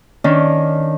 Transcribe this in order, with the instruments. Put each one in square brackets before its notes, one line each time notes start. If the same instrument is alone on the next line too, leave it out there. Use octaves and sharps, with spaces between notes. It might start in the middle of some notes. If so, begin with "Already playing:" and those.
[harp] D#3 C#4 D4